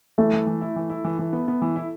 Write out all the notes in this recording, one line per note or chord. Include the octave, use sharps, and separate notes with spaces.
E3 A3
E3
E3
E4
E3
E4
E3
E3
B3
B3
E3
E4